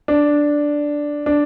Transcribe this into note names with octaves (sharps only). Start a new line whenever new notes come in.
D4
D4